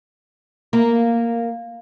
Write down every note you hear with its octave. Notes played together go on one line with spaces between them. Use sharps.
A#3